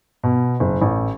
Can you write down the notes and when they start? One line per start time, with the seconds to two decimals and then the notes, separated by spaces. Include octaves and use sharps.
0.24 B2
0.60 F#1
0.81 A1